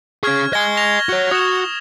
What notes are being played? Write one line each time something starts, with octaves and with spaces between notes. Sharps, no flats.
C#4 G#4 C#6 F6 G#6
D#5 G#5 G#6 G7
A#6 F7
F#4 C#5
F#4 D#6 E7